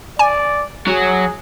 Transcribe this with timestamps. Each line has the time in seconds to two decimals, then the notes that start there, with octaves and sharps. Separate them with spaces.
0.19 D5 G#5
0.87 F#3 G#4